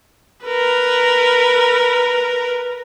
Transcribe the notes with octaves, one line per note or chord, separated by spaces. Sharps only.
A#4 B4